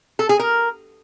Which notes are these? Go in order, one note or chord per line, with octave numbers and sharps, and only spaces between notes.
A4
G#4
A#4